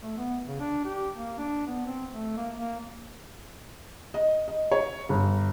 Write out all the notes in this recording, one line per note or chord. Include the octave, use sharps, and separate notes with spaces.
A3
B3
C#3
D4
G4
A#3
D4
B3
C4
A3
A#3
A#3
D#5
D#5
C#5
G1